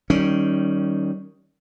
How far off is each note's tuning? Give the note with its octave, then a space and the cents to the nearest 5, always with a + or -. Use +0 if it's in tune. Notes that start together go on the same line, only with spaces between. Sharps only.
D#3 +0 G3 -20 C#4 +0